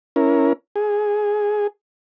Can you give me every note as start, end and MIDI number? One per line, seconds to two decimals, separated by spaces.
0.16 0.53 61
0.16 0.53 64
0.16 0.53 70
0.76 1.67 68